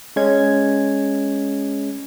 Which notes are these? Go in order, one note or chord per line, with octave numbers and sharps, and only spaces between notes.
G#3 C#4 G#6